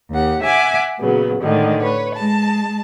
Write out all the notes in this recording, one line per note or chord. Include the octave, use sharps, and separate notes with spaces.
D#2 G4 F#5
E5 F#5 G#5 D6
A#2 C#3 F#3 B3
A2 D3 D#3 G#3
B4 C#5
G#3 A5